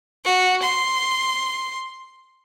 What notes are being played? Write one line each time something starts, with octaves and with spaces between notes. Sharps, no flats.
F#4
C6